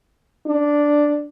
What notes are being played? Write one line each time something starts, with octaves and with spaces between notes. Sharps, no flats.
D4